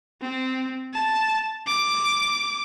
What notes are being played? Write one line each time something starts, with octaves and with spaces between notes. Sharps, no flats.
C4
A5
D6